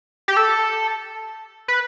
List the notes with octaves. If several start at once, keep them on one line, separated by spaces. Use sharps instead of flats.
G4
A4
B4